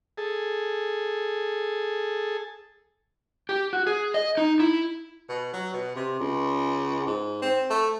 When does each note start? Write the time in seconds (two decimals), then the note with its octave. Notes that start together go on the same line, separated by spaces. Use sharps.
0.18 G#4 A4
3.49 G4
3.73 F#4
3.87 G#4
4.14 D#5
4.37 D#4
4.60 E4
5.29 B2
5.53 F#3
5.74 B2
5.96 C3
6.20 C#2
7.06 G#2
7.42 C4
7.70 A3